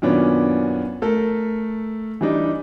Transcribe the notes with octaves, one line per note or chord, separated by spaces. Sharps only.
F#2 A#2 D#3 B3 C#4 D4
A3 A4 A#4
E3 G3 D4 D#4